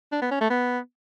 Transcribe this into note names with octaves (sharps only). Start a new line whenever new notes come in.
D4
B3
C#4
A3
B3